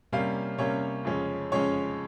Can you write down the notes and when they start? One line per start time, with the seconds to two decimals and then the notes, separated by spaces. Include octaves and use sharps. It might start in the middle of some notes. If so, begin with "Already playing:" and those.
0.12 C3 G3 A#3 C#4 F5
0.59 C3 G3 A#3 C#4 C#5
1.05 F2 C#3 G#3 C#4
1.52 F2 C#3 G#3 C#4 C#5